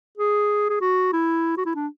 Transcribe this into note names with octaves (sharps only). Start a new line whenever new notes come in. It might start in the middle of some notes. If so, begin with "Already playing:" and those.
G#4
G#4
F#4
E4
F#4
E4
D4